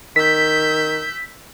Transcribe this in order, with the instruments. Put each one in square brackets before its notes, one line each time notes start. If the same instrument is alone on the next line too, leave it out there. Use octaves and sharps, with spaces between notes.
[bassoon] D#3 [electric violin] E6 G6 [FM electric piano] B6